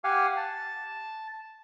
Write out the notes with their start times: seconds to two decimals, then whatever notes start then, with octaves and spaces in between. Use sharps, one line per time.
0.04 G4 F5 F#5 G#5
0.37 A5